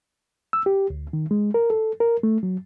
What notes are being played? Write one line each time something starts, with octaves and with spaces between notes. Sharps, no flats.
E6
G4
D2
D#3
G#3
A#4
A4
A#4
A3
F#3